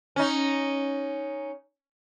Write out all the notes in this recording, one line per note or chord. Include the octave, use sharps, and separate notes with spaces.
C#4 D#4